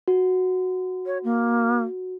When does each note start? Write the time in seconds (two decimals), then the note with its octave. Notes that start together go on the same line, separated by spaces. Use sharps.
0.08 F#4
1.06 C#5
1.24 A#3